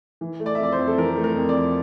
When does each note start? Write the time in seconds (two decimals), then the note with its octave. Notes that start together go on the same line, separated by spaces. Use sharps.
0.21 E3
0.40 A3
0.46 D5
0.55 E5
0.59 F2 D5
0.72 C5
0.79 F2
0.88 A4
0.98 E3 A#4
1.17 A3
1.24 A#4
1.36 F2
1.49 D5
1.55 F2